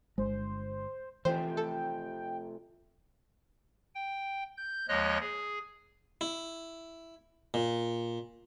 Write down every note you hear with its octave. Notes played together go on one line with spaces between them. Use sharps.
G1 G#3 C5
C3 E3 F3 A3 C5 G5
A4
G5
G6
D#2 F3 G#3 C#5 D#5 F#6
G#4
E4
A#2